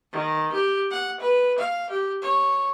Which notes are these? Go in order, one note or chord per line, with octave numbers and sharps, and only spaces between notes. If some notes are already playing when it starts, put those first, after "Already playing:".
D#3
G4
F#5
B4
F5
G4
C#5